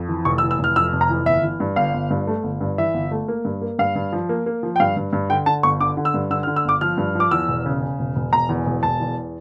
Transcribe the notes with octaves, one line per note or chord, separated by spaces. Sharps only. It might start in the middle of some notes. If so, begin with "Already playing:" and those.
Already playing: F2
E3
F1 C#6
E6
E3
E6
F1 F6
F2 E6
F1
A#5
E3
G1 E5
E3
G2
G1 F5
G1
G2
A3
G1
G2
E3 E5
G1
A3
A#3
G2
A#3
G2 F5
G2
F3
A#3
A#3
F3
G5
G2 F5
G2
G2
D3 G5
D3 A5
G1 C#6
D3 D6
D3
E6
G2
D3 E6
F6
D3
E6
G1 D6
F3 F6
G2
F3 D6
E2 E6
E1
C#3
C#3
E1
E1
E1 A#5
E2
E1
E1 A5
E2